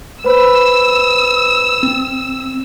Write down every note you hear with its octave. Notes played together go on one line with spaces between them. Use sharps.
B4 C5 B5 E6
C4